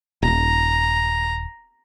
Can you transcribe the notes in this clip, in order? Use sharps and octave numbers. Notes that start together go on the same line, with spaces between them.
D#1 A#5